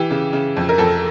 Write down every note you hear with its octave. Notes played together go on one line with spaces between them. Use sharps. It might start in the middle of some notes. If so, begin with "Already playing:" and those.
Already playing: E3 G4
C#3
C#3
F2
A#4
F2 A4